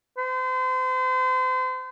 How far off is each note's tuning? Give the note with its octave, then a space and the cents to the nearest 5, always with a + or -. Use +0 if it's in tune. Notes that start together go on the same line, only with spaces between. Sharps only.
C5 -35